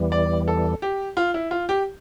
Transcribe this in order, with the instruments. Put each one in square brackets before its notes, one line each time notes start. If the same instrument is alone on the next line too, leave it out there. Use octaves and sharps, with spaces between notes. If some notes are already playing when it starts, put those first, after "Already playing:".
Already playing: [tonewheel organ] E2 E3 G3
[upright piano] D5
A4
G4
F4
E4
F4
G4